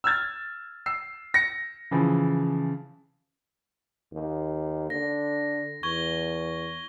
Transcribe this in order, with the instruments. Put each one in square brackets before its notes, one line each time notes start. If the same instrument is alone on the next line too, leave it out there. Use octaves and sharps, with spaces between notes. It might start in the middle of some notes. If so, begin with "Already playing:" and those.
[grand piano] E6 F6 G#6 A6
E6 C7
A#6 C#7
C#3 E3 F3
[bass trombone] D#2
[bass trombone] D3 [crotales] A#6
[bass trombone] E2 [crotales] C#6 G#6 G7